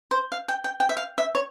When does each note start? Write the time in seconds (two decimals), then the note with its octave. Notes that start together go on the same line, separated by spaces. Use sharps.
0.11 C5
0.32 F5
0.48 G5
0.64 G5
0.80 G5
0.89 E5
0.97 F5
1.18 E5
1.35 C#5